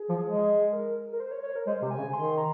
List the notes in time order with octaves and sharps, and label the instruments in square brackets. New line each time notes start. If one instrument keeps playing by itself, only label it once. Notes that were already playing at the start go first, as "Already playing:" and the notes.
Already playing: [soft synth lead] G#4
[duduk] F3
G#3
[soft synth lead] A#4
A#4
C5
C#5
C#5
A#4
[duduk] G#3 [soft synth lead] C5
[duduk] C3
[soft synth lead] G#5
[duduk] C#3
[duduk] D#3 [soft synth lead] C6
[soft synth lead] A#5